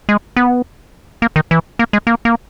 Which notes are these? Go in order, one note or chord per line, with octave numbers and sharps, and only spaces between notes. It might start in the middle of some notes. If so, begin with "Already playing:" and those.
G#3
B3
A#3
D#3
E3
A#3
G#3
A#3
A#3